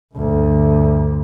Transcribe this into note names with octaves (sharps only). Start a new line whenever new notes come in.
D2 G2